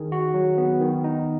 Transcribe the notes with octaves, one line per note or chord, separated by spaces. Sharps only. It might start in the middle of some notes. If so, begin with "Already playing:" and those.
Already playing: D#3 G#4
F#4
F#3
B3
D#3
D#4